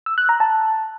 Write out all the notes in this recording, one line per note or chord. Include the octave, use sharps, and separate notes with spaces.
E6
F#6
A#5
A5